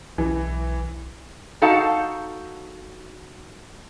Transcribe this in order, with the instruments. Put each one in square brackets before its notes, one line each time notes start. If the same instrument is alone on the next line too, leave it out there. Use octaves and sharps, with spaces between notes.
[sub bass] B1 [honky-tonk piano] E3
[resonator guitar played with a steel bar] D#4 F#4 A4 F5 F#5 A5